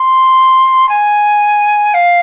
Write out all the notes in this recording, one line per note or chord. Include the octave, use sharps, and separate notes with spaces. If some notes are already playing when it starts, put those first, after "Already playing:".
Already playing: C6
G#5
F5